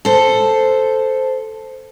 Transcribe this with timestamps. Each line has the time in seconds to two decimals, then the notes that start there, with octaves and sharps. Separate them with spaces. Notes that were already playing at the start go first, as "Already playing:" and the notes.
0.05 A4 C5